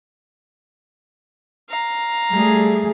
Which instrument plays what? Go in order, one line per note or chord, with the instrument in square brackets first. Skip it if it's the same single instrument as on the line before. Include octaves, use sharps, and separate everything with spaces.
[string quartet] F5 A#5
[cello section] G3 A3 G#4